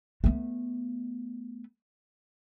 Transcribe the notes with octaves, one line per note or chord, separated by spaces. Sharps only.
A3 B3